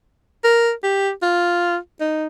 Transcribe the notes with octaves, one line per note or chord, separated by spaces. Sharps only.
A#4
G4
F4
D#4